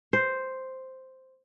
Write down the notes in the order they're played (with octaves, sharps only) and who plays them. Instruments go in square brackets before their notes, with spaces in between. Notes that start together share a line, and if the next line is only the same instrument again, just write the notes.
[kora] C5